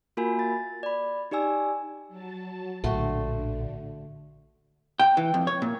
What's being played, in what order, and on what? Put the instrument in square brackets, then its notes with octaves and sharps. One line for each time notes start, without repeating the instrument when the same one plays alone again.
[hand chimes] A#3 F4 F#4 A#4 G#5 B5
A6
D5 B5
D#4 G4 D5 G#5 E6
[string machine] F#3 A5
[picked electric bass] A#1 A2 [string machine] D3 [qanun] A3 F#4 C6
[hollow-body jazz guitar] G5
E3
F2
C#5
A#2